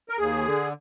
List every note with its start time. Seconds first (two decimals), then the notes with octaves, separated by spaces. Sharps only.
0.09 A#4
0.18 D#2 G#4
0.45 D3